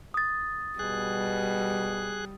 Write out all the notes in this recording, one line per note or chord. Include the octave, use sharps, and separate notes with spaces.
D#6 A6
B2 G3 G#4 F#6